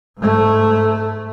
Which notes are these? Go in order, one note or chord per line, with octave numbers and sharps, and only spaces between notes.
G#2 A3